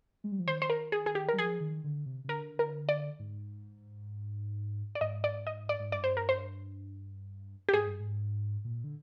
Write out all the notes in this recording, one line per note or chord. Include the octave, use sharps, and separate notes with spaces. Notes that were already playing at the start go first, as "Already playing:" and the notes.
G#3
G3
F3
D#3 C5
C5
A#4
G#4
G#4
G4
A#4
G3
F3 G#4
D#3
D3
C3
C3
D3 A#4
A#4
D5
G#2
D5
G#2 D#5
D5
D#5
D5
G#2
G2 D5
C5
A#4
C5
G4
G#2 G#4
G2
G#2
A#2
D3